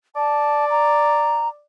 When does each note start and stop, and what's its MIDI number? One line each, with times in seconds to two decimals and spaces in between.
0.16 1.64 74
0.16 0.65 81
0.70 1.48 82